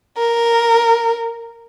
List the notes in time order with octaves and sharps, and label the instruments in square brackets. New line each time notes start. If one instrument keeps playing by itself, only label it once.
[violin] A#4